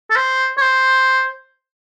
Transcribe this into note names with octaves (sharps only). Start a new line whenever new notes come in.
A4
C5
C#5
C5